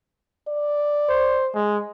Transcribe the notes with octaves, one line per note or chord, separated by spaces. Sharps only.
D5
C5
G#3